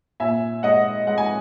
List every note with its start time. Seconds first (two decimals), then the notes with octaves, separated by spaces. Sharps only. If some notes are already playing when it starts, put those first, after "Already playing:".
0.20 A#2 E5 G#5
0.63 G#3 D#5 F#5
1.07 G#3 F#5
1.18 G#5